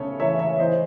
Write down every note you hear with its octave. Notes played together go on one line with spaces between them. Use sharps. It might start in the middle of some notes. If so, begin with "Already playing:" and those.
Already playing: C#3 A3 A4 C#5
E3 C#5 E5
C#5 E5
E3 C5 D#5